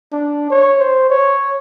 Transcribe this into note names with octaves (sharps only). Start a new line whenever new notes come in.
D4
C#5
C5
C#5